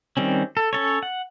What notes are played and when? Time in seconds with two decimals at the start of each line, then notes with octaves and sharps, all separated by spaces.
0.17 D#3 G3 C4 C#4
0.57 A4
0.73 C#4 A4 C#5
1.03 F#5